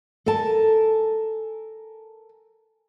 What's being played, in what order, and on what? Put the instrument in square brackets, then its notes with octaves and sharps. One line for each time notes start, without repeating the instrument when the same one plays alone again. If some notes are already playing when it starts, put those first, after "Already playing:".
[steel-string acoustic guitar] A4 A#4 G#5 A5